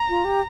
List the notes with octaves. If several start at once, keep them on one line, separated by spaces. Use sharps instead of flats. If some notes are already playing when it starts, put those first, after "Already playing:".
Already playing: A#5
F4
G4